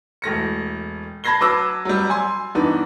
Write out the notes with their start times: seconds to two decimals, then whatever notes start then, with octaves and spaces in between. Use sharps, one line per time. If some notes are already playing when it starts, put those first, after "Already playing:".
0.22 E1 A3 A#6 C#7
1.24 A5 B5 G#6 A#6 C7 G7
1.40 F#3 B4 A5 D6 E6 A#6
1.85 F#3 G3
2.10 G#5 C6
2.55 G2 E3 B3 D4 D#4